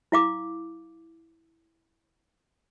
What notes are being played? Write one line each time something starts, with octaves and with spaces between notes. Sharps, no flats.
E4 F5 D6